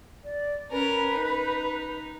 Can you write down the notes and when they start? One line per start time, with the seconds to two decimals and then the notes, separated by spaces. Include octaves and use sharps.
0.24 D5
0.71 C#4 A#4 B4
1.12 D#4